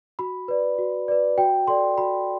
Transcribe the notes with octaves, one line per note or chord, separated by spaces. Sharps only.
F#4 B5
B4 D5
F#4
B4 D5
F#4 G5
A4 D5 C6
F#4 B5